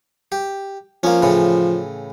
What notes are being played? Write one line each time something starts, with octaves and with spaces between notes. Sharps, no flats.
G4
F3 A#3 C#4
A2 C#3 E3